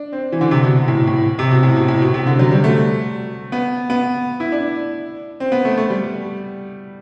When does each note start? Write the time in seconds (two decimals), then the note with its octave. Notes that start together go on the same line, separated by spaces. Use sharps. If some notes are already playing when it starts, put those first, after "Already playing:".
Already playing: D4
0.12 C4
0.32 E3
0.41 D3
0.51 C3
0.64 B2
0.88 A2
1.07 A2
1.39 C3
1.51 B2
1.63 A2
1.76 B2
1.88 A2
2.02 B2
2.14 C3
2.27 D3
2.39 F#3
2.51 G3
2.64 A3
3.52 B3
3.90 B3
4.40 E4
4.52 D4
5.40 C4
5.52 B3
5.65 A3
5.78 A3
5.90 G3